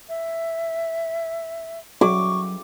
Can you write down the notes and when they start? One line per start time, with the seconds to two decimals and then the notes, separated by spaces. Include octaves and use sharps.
0.09 E5
2.01 F#3 C#6 D6